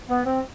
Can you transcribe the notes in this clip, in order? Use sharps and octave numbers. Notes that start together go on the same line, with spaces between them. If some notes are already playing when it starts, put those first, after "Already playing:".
B3
C4